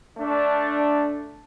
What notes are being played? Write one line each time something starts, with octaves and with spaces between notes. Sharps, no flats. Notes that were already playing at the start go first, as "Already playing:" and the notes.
A3 D4